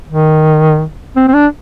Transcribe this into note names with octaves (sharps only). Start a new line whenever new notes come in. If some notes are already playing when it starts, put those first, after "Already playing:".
D#3
C4
C4
D4